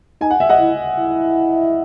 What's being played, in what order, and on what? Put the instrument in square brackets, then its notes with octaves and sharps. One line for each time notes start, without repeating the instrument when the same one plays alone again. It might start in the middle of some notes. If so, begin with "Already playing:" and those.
[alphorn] D#4 [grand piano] G#5
[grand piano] F#5
E5
D#5 F#5
[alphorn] E4
E4